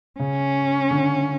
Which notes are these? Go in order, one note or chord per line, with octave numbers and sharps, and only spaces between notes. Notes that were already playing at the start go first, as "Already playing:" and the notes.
C#3 C#4
D3